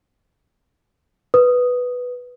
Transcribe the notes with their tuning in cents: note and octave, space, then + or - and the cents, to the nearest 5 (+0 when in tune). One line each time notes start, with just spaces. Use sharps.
B4 +0 D#6 +0